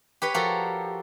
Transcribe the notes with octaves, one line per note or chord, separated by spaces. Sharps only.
G4 B4 C#5
F3 F#4 G4 A4 A#4